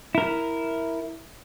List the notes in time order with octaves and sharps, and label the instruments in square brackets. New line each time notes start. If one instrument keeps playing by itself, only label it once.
[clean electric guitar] E4 A#4